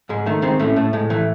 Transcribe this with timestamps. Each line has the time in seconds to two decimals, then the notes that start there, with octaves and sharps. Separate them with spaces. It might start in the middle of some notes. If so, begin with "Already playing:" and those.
0.09 G#2 G#3
0.26 D#3 A3
0.42 D#3 G#3 C4
0.59 A2 A3 C#4
0.76 A2 A3
0.93 A2 G#3
1.10 E3 A3